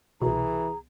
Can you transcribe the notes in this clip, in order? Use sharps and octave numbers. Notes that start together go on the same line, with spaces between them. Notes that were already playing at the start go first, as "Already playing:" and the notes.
C2 B2 E3 G#4 A#5